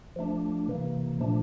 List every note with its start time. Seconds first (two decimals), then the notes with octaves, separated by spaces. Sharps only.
0.16 F3 A3 D4
0.68 C3 E3 A#3
1.19 A#2 F3 A3 D4